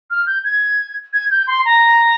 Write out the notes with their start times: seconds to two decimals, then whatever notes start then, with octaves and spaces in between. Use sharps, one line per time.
0.11 F6
0.27 G6
0.44 G#6
1.13 G#6
1.31 G6
1.47 C6
1.65 A#5